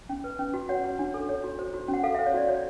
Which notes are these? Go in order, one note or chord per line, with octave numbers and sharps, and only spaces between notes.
C#4
B4
C#4
F#4
C#5 F#5
F#4
D4
A4
C#5
F#4
C5
F#4
C#4
F#5
A4 F5
C5 E5
C#5
F#4 D5
F#4 C#5